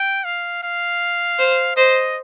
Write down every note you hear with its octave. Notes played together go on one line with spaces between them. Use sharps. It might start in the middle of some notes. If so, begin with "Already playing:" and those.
Already playing: G5
F5
F5
C5
C5 D#5